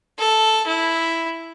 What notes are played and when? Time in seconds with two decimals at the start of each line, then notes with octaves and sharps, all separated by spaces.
0.19 A4
0.67 E4